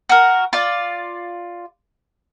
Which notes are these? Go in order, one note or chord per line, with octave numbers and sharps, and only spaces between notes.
F#4 A#4
F4 D5